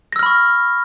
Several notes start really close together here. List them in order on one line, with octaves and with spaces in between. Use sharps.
A#6 E6 F6 B5 C#6